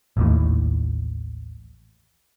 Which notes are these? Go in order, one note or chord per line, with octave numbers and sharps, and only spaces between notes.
A1 D#2 A2